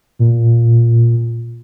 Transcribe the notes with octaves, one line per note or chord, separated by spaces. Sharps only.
A#2